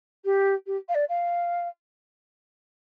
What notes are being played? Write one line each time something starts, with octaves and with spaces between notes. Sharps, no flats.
G4
G4
F5
D5
F5